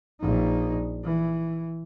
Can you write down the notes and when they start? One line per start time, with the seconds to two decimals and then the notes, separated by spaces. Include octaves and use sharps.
0.21 A#1 D#4
1.04 E3